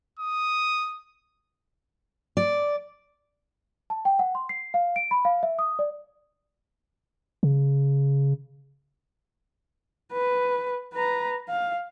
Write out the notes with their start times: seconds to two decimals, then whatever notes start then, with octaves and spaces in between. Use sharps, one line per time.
0.19 D#6
2.37 D5
3.90 A5
4.05 G5
4.19 F#5
4.35 C6
4.49 C7
4.74 F5
4.96 D7
5.11 B5
5.25 F5
5.43 E5
5.59 D#6
5.79 D5
7.43 C#3
10.13 B4
10.93 B4 A#5
11.49 F5